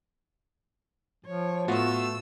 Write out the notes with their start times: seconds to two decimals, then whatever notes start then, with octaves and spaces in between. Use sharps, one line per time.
1.25 F3 C#5
1.68 A2 A3 B3 F4 F#4 E6